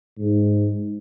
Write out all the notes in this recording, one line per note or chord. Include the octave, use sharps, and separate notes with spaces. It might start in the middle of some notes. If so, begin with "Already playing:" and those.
G#2